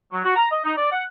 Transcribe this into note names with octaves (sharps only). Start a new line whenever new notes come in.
F#3
F#4
A#5
D#5
D#4
D5
F#5